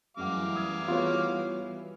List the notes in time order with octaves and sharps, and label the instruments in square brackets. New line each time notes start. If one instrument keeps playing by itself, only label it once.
[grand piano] F#2 G#3 F#5 [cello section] E3 G3 [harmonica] F5 D6
[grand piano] D#6 E6 G#6
[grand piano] B3 G#4 B4 [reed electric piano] F4 F#4 C#5